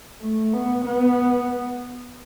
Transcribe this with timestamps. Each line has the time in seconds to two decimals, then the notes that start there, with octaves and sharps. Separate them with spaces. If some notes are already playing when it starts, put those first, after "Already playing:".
0.22 A3
0.54 B3
0.86 B3